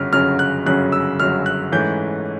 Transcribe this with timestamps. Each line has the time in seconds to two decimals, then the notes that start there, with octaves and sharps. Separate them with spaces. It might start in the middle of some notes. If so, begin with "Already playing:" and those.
Already playing: G1 F#2 C#3 F#3 F6
0.13 G1 F#2 C#3 F#3 F6
0.39 F#6
0.66 G1 F#2 C#3 F#3 F#6
0.92 E6
1.19 G1 F#2 C#3 F#3 F6
1.46 F#6
1.72 G#2 E3 A3 C#4 G6